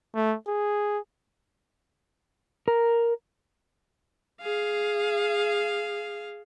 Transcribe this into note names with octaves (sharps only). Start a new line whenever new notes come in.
A3
G#4
A#4
G#4 F5